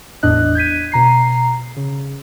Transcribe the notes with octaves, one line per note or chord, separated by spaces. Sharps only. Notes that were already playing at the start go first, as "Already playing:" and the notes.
G#1 E2 A2 D4 D#5 F#6
G6 G#6 B6 D#7
B2 A#5 C7
C#3